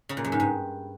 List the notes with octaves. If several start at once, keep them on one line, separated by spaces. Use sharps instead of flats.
C#3
A#2
F#2
G#2
G2